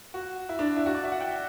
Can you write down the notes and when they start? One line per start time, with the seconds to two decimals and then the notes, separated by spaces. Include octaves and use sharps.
0.14 F#4
0.49 E4
0.59 D4
0.77 E4
0.86 F#4
0.95 D5
1.03 E5
1.12 F#5
1.21 G5